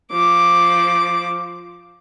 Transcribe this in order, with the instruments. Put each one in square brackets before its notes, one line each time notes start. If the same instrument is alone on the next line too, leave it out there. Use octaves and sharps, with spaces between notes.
[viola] F3 D6